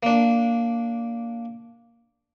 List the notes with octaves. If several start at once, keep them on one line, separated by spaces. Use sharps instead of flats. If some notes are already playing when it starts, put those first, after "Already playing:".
A#3 D4